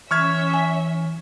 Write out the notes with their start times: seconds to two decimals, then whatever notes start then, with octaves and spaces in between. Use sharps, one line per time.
0.11 E3 C#4 C#5 E5 C#6 F6 G#6
0.54 G#5